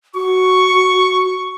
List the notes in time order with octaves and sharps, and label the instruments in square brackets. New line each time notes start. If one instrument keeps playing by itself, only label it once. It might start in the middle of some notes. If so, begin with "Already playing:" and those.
[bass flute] F#4 [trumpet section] C#6